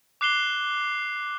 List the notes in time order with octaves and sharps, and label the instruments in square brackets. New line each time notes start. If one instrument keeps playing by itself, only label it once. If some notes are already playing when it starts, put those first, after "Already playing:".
[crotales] D6 F#6 C7 E7 G7